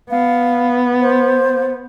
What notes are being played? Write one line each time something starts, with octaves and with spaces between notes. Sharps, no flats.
B3 F5
C5